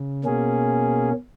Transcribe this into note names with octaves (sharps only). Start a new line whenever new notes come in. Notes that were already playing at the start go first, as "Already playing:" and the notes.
Already playing: C#3
B2 A#3 C#4 G#4